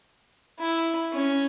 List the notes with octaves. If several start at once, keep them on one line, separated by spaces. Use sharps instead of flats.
E4
C#4